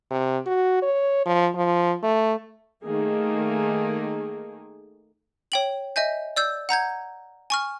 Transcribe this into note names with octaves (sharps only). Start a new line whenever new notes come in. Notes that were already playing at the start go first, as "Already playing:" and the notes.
C3
F#4
C#5
F3
F3
A3
D#3 A3 A#3 G#4
C#5 G5 F#7
D#5 E5 G#5 G6
D5 E6 G6
F#5 A#5 G6 G#6
G#5 C#6 F6